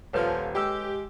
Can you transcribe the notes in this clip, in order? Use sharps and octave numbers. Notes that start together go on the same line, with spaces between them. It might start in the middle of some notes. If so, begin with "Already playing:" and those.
D#1 F3 A4 B4 C#5
G#3 G4 E6